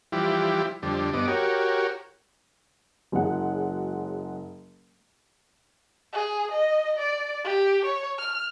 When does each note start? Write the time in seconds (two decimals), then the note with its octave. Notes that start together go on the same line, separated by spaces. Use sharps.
0.12 E3 F3 G3 E4 G4
0.82 F2 D3 G3
1.13 G2 B3 D#5 D6
1.27 F#4 G4 A#4 C#5
3.12 F#1 F#3 G#3 F#5
6.13 G#4
6.52 D#5
6.99 D5
7.45 G4
7.85 C#5
8.18 F6